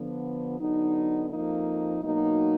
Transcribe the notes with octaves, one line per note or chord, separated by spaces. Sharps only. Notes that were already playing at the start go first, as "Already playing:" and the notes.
Already playing: D3 F3 B3
D3 F#3 B3 D#4
F2 F3 A#3 D#4
B2 F#3 A#3 D#4